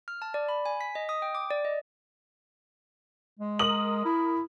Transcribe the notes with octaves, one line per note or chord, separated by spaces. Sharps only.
F6
A5
D5
B5
G#5
B6
D#5
D#6
G5
D6
D5
D#5
G#3
A#4 D#6 F#7
E4